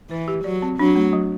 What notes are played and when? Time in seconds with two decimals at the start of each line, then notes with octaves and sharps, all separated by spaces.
0.10 E3 B4
0.28 G4
0.44 F#3 D5
0.62 C4
0.79 F#3 D4
0.95 A3
1.13 F#3